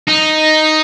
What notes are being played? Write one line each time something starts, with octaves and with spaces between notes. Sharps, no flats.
D#4